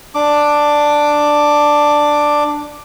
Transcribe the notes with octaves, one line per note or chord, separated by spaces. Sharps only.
D4 D6